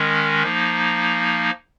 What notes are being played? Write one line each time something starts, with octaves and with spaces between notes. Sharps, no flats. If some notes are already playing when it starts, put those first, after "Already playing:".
Already playing: D#3 G#3 C#4
F3 A#3 D#4